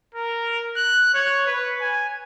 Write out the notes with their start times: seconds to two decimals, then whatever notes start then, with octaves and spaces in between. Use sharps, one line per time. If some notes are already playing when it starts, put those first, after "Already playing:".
0.15 A#4
0.77 F#6
1.14 C#5
1.47 B4
1.81 G#5